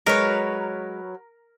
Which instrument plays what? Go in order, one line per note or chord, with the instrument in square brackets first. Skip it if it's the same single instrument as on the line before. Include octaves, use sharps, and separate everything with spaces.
[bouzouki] F#3 B4 C#5 [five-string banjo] G#3 [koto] A#4